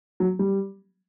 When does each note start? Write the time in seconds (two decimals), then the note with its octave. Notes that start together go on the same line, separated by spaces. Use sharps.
0.20 F#3
0.39 G3